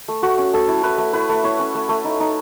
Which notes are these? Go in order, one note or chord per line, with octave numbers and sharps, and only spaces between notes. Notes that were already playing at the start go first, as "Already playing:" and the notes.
A3
A3 F#4
C#4
A3 A4
E4
E4 B4
A3
E4 B4
A3
E4 C#5
C#4
A3
A3
D#4
D#4